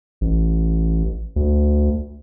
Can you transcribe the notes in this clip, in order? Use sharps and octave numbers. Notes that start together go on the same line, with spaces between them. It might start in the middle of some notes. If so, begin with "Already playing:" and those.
A1
D2